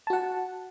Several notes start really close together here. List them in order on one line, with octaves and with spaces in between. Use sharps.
A5 F#4 F#5